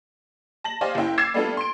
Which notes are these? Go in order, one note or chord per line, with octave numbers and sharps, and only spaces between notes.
A5 A#6 F#7
G4 C5 D5 D#5 F5 G#5
F#1 C#4 E4 G5
D6 E6 G#6 A6 C7 E7
G3 A3 B3 D4 F4 A4
C6 D7